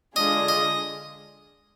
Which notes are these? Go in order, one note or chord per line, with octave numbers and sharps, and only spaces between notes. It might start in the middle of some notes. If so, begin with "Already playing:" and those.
D3 G#3 D4 F4 G#4 D#5
D#5